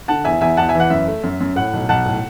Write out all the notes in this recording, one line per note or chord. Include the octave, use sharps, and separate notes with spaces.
D3 F#5 A5
E2 E5 G#5
E2 E5 G#5
E2 F#5 A5
E5 G#5
E3
F#5
F#2 E5
A3
F#2
F#2
A2 F#5
B1
B1 F#5 A5
A2